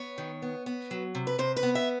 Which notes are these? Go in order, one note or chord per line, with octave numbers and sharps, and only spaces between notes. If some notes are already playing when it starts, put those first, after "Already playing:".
Already playing: B3 C#5
D#3
B3
B3
F#3
C3
B4
C3 C5
B4
B3
E5